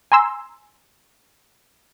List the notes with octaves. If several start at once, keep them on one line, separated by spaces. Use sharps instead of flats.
G#5 A#5 C6 E6